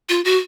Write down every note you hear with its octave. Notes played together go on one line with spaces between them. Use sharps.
F4
F#4